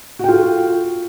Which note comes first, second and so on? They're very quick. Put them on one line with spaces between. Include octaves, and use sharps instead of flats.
F#4 G5 F4 A4